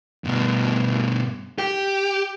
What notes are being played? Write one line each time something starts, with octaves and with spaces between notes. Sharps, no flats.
G2 B2
G4